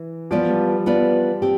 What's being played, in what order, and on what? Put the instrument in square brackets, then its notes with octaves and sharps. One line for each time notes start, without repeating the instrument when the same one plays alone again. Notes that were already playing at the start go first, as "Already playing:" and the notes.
Already playing: [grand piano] E3
[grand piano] F3 [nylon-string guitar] B3 F4 B4 D5
[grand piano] G3
F3
[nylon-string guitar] B3 F4 B4 D5
C4 G4